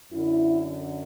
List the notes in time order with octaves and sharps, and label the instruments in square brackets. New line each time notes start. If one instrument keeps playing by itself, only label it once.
[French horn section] F#2 D3 E4